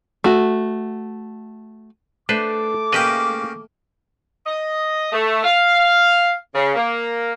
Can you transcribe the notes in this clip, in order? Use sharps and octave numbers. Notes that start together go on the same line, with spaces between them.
A3 F#4
A3 D4 B4 C5 D6
C#3 A#3 G4 B4 D#5 G5
D#5
A3
F5
C#3
A#3